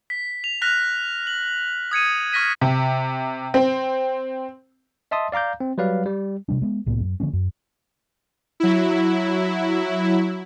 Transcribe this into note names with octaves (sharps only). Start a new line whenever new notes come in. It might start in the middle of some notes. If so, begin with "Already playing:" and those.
B6
F7
F6 F#6 A#6 B6 F7
F#7
D#6 G#6 C#7 D#7
C#6 F6 A#6 B6 D#7
C3
C4
D#5 E5 A5 C6 D#6
D5 F5 A#5 D6 G6
C4
F#3 G3 B4 D5 F5
G3
C3 G3 D4
G#3 B3
C2 A2 A#3 B3
F#2
D3 F3 A#3 C#4
F#2
F#3 E4